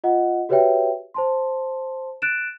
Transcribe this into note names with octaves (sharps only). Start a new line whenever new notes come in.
F4 D#5 F#5
F#4 G4 B4 C#5 E5 G5
C5 A5 C6
F#6 A6 D7 E7